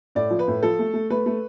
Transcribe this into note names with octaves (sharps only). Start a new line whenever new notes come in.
A2 D5
F3
B4
A2
F3 A4
A3
A3
A3 B4
A3